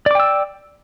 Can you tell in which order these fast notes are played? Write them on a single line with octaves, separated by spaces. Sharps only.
D5 D6 G5 E6